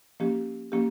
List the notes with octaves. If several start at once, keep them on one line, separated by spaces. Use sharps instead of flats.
F3 A#3 C#4 G4
F3 A#3 C#4 G4